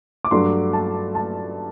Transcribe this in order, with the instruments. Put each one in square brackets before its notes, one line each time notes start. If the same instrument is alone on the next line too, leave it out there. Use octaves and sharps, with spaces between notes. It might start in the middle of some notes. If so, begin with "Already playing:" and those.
[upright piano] D6
G2 F#3 A3 C6
A5
A5